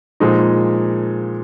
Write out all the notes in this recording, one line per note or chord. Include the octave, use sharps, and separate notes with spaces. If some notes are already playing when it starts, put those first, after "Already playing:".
A#2 F3 G#3 D#4